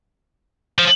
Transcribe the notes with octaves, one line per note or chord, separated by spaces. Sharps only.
F3